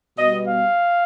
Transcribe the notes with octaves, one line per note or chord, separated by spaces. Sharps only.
B2 G3 B3 D#5
F5